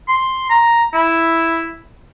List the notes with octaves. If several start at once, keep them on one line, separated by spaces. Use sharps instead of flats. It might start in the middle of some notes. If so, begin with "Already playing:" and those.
C6
A#5
E4